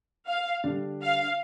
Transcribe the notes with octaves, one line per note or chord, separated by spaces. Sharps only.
F5
D3 G3 D4
F5